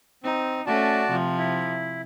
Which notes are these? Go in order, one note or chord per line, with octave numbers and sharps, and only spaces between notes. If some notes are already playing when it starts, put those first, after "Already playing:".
C4 D#4
A3 C#4 F#4 D5 A5
C3 F3
E4